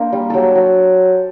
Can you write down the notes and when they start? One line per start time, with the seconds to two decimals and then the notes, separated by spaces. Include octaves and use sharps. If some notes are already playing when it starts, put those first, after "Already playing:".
Already playing: A#3 D4 A#4 C5
0.12 G3
0.30 F#3 G4 A4
0.55 F#3